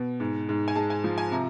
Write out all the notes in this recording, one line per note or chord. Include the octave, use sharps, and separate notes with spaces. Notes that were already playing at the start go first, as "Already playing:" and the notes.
Already playing: B2
G#2
G#2
G#5
G#3 A5
G#5
F3
G#5
C3 A#5